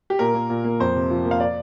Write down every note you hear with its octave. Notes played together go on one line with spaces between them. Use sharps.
G4
A#2 A#4
A#3
A#2
A#3
F2 C5
C3
F3
A#3
F5
D5